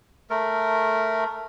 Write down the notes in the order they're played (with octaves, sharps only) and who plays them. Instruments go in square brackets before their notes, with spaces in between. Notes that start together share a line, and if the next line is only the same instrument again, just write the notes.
[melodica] A3 A#4